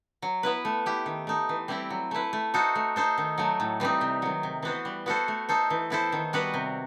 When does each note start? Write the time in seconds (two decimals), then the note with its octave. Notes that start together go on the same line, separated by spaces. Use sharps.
0.22 F#3
0.43 B3 E4 B4
0.65 A3
0.86 E4 G4
1.06 D#3
1.27 A3 D#4
1.49 E3
1.68 G3 C4 E4 G4
1.90 F#3
2.11 A3 E4 B4
2.33 A3
2.54 D#4 F#4 A4 C5
2.75 A3
2.96 D#4 A4 C5
3.18 D#3
3.38 F#3 A3
3.60 A2
3.80 E3 G3 C4 D#4
4.01 C3
4.22 D#3 F#3
4.43 C3
4.63 E3 B3 F#4 C5
4.85 G3
5.06 B3 F#4 A4 C5
5.28 A3
5.49 D#4 A4 C5
5.70 E3
5.90 B3 E4 A4 C5
6.12 D#3
6.33 G3 B3 F#4 B4
6.54 C3